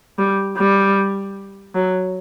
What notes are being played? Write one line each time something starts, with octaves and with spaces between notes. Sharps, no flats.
G3
G3
F#3